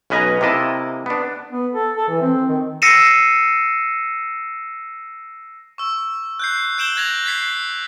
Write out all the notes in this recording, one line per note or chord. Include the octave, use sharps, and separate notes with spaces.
B1 C#4 B4 D#5 G#5 A#5
C3 A#3 E4 D#5 A5
B3 D4
B3
A4
A4
E3
C4
D#3
E6 A#6 C7 C#7 D#7 E7
C#6 E6
F#6 G6 C7
F#6 G6 D7 E7 F#7 G7
F#6 G#6 A#6 F7
F#6 G#6 B6 C7